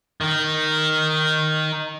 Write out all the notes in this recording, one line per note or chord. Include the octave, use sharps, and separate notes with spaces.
D#3 D#4